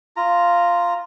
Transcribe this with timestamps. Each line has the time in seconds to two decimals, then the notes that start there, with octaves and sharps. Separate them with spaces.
0.17 F4 A#5